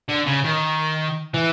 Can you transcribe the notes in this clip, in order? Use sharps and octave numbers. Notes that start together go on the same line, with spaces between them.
D3
C#3
D#3
E3